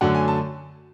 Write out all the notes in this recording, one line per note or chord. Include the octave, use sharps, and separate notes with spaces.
F#2 D3 F#3 A3 F#5
G#5
A5